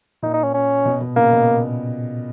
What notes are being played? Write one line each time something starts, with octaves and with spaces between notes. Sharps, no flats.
A#2 D#4
D#4
C#4
C#4
B2
B2
A#2 C#3 A#3
B2